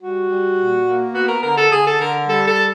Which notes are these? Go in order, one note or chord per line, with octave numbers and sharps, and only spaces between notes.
G3 F#4
G3
A#2
A#3
B3 F#4
A#4
D3 A#4
A4
D3 G#4
A4
D3 A#4
G3 A4
A4